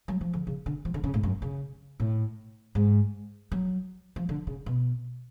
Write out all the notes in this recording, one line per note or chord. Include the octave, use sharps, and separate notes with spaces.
F#3
F3
D3
C#3
D3
F3
D3
C#3
A2
F#2
C#3
A2
G#2
F#3
F3
D3
C#3
B2